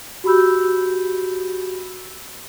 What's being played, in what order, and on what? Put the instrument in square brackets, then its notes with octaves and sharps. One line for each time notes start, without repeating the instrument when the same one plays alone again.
[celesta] F#4 G4 B5 E6 G6